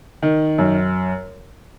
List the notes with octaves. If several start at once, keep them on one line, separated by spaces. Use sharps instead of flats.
D#3
F#2